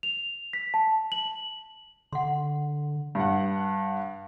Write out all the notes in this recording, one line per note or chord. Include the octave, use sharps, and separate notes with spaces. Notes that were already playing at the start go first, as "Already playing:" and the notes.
F7
B6
A5
F#7
D3 F#5 C6
G2 F#5